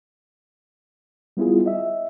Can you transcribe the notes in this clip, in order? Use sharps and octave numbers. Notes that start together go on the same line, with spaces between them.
G3 B3 E4 F4 G#4
D#5 E5